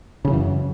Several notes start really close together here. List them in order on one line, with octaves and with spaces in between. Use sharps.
C#3 G3 E3 F#2